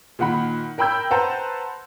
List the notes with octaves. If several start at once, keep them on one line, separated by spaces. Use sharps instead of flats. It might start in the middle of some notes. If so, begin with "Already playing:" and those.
A#2 D#3 F#5 B5
A#4 G5 B5 E6 G6
B4 C5 F#5 A5 A#5